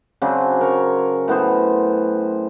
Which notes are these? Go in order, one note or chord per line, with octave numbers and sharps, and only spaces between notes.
C#3 F#3 C4 D4
A#4 C#5
A2 B3 C5